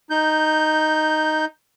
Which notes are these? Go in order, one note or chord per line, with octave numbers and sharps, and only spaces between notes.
D#4 G6